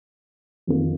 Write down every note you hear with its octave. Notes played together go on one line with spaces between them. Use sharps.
F2 D#3 A#3